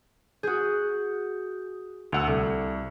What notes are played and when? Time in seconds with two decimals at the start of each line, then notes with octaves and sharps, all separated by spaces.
0.43 F#4 G#4 D#6 G6
2.12 D2 F#5 E6 F7
2.27 C2 A4